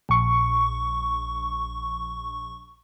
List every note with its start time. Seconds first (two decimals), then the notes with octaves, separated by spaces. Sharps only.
0.09 A#1 C#6